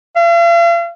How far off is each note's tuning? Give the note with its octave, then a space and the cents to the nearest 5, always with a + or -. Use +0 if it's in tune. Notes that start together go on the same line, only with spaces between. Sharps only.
F5 -45